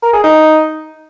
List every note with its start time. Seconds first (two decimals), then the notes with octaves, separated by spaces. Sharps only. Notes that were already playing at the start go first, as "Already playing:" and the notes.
0.03 A#4
0.13 G#4
0.23 D#4